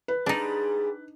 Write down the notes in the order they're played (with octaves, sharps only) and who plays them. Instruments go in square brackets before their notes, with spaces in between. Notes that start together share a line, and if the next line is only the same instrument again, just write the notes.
[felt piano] B4
[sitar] G#2 G3 G#4 [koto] D4 D#4